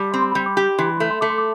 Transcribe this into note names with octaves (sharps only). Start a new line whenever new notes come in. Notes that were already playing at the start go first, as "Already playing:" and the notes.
Already playing: G3 A5
C4 B5
C6
B5
G3
D6
G4
E3 C6
B5
C6
A3
C6
A3 D6
C6
D6